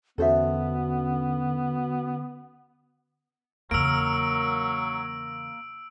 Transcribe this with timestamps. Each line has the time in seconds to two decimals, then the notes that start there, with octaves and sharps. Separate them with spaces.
0.18 E2 D3 B3 C#4 F#4 A4 C5 E5
3.71 E2 C#3 F#3 A#3 A#4 E6 D7